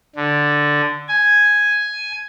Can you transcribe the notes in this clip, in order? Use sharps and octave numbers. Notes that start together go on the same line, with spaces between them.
D3
G#5